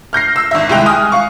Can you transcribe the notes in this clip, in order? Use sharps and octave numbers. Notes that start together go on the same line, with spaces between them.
F6 G6 A#6 C7
E6
G#1 E5
C2 G#3 E4 G5 F#6 F7
G#5 D#6 F6
F5 C#6